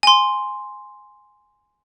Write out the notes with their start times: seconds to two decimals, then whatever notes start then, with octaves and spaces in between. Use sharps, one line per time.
0.03 G#5 C6